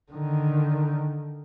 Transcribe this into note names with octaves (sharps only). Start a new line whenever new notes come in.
D3 D#3